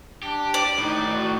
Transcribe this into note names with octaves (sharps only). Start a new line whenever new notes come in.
D4 G4
D5
A2 D#4 B4
F#4